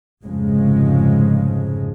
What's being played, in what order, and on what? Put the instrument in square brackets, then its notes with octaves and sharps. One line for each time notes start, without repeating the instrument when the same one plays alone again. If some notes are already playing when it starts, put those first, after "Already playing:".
[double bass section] F1 G#2 C#3 F3 G#3